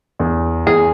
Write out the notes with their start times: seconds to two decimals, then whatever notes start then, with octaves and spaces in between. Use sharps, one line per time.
0.20 E2
0.66 E2 G#4